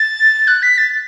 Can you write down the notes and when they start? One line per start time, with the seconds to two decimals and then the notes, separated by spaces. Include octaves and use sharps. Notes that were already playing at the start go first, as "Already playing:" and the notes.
Already playing: A6
0.48 F#6
0.62 B6
0.78 A6